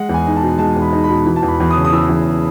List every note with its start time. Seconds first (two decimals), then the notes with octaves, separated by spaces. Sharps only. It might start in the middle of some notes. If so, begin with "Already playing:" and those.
Already playing: G#3 F#5
0.09 E2
0.14 G#5
0.26 D#4
0.36 A5
0.43 B2
0.58 G#3 A5
0.76 E2
0.82 B5
0.92 D#4
1.04 B5
1.09 B2
1.26 E3
1.36 A5
1.43 E2
1.48 B5
1.60 E2
1.71 D#6
1.76 C#3
1.85 D#6
1.92 E3 E6
2.09 E2